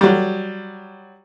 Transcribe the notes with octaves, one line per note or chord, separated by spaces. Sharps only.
F#3 G3